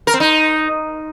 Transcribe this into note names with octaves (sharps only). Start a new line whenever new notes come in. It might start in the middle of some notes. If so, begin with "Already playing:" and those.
A#4
C4
D#4